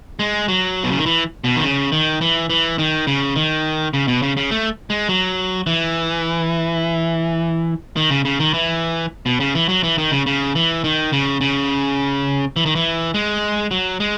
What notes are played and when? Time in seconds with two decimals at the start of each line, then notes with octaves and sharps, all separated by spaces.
0.19 G#3
0.48 F#3
0.84 B2
0.91 C#3
0.99 D#3
1.06 E3
1.44 B2
1.56 D#3
1.63 C#3
1.92 D#3
2.21 E3
2.50 E3
2.78 D#3
3.07 C#3
3.36 D#3
3.94 C#3
4.08 B2
4.22 C#3
4.37 C#3
4.51 A3
4.90 G#3
5.09 F#3
5.67 E3
7.96 D#3
8.11 C#3
8.25 C#3
8.40 D#3
8.54 E3
9.26 B2
9.40 C#3
9.55 E3
9.69 F#3
9.83 E3
9.98 D#3
10.12 C#3
10.26 C#3
10.55 E3
10.84 D#3
11.12 C#3
11.41 C#3
12.56 E3
12.66 D#3
12.75 E3
13.14 G#3
13.71 F#3
14.00 G#3